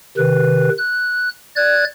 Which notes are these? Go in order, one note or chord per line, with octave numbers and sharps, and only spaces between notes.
C3 D#3 B4
F#6
D5 F#6 G#6